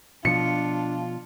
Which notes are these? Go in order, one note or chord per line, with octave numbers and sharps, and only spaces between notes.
B2 F3 D4 F4 C#7